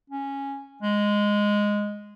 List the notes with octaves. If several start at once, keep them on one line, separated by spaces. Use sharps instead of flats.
C#4
G#3